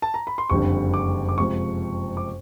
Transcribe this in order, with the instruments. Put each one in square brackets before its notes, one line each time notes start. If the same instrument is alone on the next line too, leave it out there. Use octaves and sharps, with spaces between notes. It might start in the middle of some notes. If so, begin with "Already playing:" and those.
[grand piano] A5
A#5
B5
C6
F#1 F2 D3 G3 C#6
D6
D6
F2 C3 F3 G#3 C#6
D6